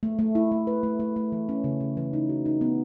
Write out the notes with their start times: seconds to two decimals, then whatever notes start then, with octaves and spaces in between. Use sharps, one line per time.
0.03 A3
0.19 A3
0.35 E4
0.52 A3
0.67 B4
0.83 A3
1.00 A3
1.16 A3
1.32 E3
1.49 C#4
1.64 C#3
1.80 C#3
1.97 E3
2.13 D#4
2.29 F#4
2.46 D#4
2.61 B3